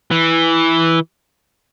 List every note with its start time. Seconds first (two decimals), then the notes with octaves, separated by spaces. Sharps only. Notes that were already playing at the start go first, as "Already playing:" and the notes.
0.11 E3